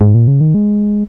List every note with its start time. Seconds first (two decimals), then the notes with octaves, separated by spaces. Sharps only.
0.01 G#2
0.15 A#2
0.27 C#3
0.41 D#3
0.54 G#3